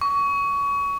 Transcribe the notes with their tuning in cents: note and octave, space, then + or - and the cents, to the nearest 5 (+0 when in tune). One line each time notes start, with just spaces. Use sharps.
C#6 +25